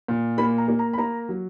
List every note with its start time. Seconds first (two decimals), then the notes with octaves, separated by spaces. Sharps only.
0.08 A#2
0.38 A#3 B5
0.58 A#5
0.68 A#3
0.79 A#5
0.93 B5
0.98 A#3 A#5
1.29 F#3